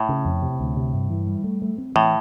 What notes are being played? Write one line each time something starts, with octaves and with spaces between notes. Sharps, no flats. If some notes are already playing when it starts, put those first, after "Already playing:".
Already playing: A2
C#3
F2
C3
D2
C3
G2
E3
G3
A3
A3
C4
A2 E3